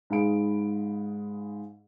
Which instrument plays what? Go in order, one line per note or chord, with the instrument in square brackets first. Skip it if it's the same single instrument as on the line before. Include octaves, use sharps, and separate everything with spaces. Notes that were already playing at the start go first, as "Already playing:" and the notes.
[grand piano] G#2 G#4 F5 B5 D7